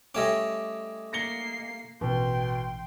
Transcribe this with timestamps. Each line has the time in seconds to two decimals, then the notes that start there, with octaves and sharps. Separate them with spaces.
0.15 G3 A3 C#4 D#5 G#5 D6
1.13 A#3 A#6 C7 C#7 G7
2.01 A1 B2 G5 C6